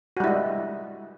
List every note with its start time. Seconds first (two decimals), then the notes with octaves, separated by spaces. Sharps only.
0.17 F#4
0.20 G3
0.24 E4
0.27 G#3